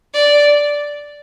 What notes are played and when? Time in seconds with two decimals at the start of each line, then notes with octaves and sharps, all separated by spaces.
0.14 D5